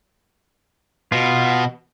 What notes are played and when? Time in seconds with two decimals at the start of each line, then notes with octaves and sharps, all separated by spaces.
1.12 B2 F4